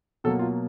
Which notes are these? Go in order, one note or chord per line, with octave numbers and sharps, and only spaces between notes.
B2 F#3 A#3 A4
F4